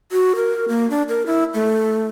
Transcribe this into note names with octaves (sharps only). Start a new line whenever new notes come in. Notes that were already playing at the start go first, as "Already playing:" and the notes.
F#4
A#4
A#3
D4
A#4
E4
A3